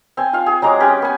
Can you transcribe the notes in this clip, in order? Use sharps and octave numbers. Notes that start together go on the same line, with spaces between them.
C4 G#5
F4 F5
G#4
F#3 G#3 A#5 D6
C#4 G4 B4 G5
B3 G#5